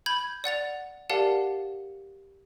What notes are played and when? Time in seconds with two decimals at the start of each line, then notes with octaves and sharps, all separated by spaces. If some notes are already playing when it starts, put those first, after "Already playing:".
0.06 B5 G6 G#6
0.44 D5 F#5 A6 F7
1.10 G4 A#4 D5 F5 F#5 A5